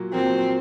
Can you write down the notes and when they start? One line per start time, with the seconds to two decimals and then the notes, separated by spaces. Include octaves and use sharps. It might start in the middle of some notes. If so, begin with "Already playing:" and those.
Already playing: A#2 F#3 A#3
0.13 A#2 F#3 A#3 C4